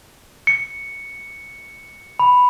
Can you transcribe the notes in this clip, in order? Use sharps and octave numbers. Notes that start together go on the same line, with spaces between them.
C#7
B5